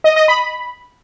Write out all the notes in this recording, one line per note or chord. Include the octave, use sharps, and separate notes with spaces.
D#5
D#5
B5